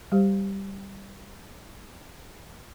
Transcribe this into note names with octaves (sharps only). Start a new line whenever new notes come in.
G3 G4 C5